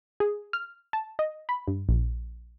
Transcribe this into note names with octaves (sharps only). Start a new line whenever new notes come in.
G#4
F6
A5
D#5
B5
G2
A#1